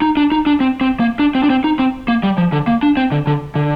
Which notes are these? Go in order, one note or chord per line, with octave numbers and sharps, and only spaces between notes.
D#4
D4
D#4
D4
C4
C4
A#3
D4
C4
D4
C4
D#4
C4
A#3
G3
F3
D3
A#3
D4
C4
D3
D3
D3